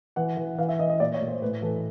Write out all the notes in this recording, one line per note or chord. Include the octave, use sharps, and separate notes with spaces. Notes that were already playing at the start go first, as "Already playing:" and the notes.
E3 F#5
E3
E3 F5
E5
E3 D#5
D#5
A#2 D5
C#5
A#2
C5
A2 B4
E3 A4